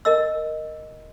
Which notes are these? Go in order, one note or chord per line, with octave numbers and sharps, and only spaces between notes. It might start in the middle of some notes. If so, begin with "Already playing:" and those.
A#4 D#5 E6